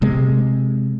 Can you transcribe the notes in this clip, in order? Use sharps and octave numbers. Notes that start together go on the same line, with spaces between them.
C3 G#3